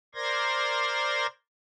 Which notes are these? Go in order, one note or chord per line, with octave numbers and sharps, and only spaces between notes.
A#4 C5 D5 C6 G#6 A#6